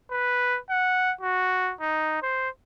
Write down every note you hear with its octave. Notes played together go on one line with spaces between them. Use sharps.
B4
F#5
F#4
D#4
C5